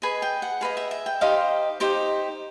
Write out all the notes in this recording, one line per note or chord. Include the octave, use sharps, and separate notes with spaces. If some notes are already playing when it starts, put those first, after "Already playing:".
G#4 B4 D#5 G#5
G5
F#5
G#4 B4 D#5 F5
E5
E5
G5
D#4 G4 C5 D#5 F5
D#4 G4 C5 D#5